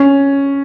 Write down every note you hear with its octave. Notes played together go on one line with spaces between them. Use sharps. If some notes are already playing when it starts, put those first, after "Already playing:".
Already playing: C#4